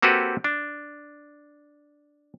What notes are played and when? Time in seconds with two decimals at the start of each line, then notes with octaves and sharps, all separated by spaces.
0.02 A#3 C4 F#4 G4 A4 B4
0.44 D4